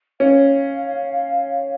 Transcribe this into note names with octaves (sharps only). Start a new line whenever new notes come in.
C#4 F5